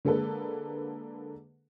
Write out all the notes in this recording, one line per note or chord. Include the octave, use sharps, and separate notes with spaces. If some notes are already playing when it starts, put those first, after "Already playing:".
D3 G#3 A#3 G#4 A4 B4